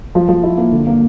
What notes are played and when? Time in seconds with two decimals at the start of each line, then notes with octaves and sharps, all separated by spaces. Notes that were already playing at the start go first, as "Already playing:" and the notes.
0.15 F3
0.29 F3
0.43 E4
0.58 A#3
0.72 D3
0.87 A#3